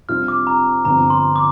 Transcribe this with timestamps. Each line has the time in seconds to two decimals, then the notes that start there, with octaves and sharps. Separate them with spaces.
0.09 F2 C3 G3 D4 F4 F6
0.28 D6
0.47 A#5
0.85 G1 G2 D3 F3 C4 A#5
1.10 C6
1.36 D6